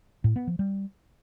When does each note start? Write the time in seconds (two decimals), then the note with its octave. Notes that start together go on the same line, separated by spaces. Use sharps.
0.24 A2
0.36 B3
0.47 F3
0.59 G3